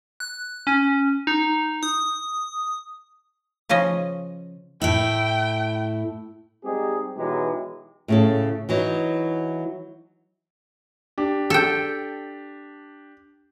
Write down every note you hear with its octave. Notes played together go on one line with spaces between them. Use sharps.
F#6
C#4
D#4
D#6
C#3 F3 C#4 D#5
A2 E4 G5
G3 G#3 C4 D#4 G4 G#4
B2 E3 F#3 G#3 D#4 G4
A2 C#3 A4
E3 F#3 D#4
D4 G4
A4 G5